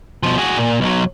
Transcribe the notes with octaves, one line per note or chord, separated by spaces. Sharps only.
B2 F3
F#4 G#4
A#2
B1 F#3